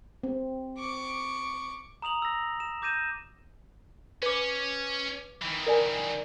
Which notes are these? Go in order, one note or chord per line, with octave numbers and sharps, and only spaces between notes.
C4
C#6 D6
A#5 D#6 F7 F#7
E6 A#6
E7
D6 G6 A#6 D#7 E7
C#4 B4 D6
D#3 E3
A#4 D5 G#5